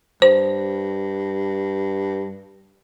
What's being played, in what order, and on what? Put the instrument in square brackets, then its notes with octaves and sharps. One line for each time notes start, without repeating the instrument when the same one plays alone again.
[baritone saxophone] G2 [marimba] C5